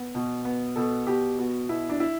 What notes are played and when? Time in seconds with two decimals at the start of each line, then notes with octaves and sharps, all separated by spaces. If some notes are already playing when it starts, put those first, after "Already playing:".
Already playing: B3
0.15 B2
0.45 B3
0.76 B2 A4
1.07 B2 G4
1.39 B3 F#4
1.69 B2 E4
1.89 D4
2.00 E4